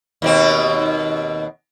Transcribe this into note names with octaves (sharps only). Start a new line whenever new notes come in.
D#2 B2 C4